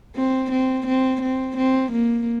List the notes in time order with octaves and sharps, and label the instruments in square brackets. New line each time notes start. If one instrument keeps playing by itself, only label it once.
[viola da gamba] C4
C4
C4
C4
C4
A#3